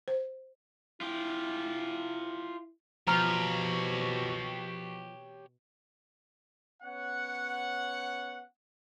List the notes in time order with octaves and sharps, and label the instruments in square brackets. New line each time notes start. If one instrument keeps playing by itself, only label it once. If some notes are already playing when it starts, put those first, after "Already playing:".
[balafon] C5
[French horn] E4 [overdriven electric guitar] F4 G4
[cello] B2 [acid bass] F3 [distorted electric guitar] G4 C#5 [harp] A#5 F6
[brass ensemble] B3 C#4 C#5 F#5